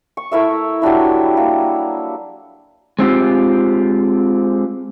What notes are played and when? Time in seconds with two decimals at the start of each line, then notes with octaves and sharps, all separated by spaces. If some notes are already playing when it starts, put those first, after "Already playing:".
0.17 C#6
0.32 A3 E4 A#4 E5
0.82 F#3 G3 D4 E4
1.37 A#3
2.99 G#3 C4 F4 G4